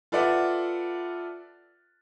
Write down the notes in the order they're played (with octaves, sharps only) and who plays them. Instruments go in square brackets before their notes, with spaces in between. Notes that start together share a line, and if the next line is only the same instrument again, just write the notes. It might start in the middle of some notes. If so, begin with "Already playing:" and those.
[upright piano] F4 A4 B4 D5 E5 F#5